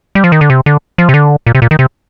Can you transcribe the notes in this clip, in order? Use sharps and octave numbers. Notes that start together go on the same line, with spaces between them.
G3
F3
D#3
D3
C3
D3
F3
C3
D3
A#2
C3
A#2
D#3
C3